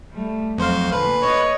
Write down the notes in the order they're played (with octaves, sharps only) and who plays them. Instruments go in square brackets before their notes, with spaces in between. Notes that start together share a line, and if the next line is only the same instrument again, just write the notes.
[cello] G3 A3
[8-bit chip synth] F2 C5 F5 [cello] F#3 F#4
[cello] A#2 D3 [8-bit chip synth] B4
[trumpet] C#5 [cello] D#5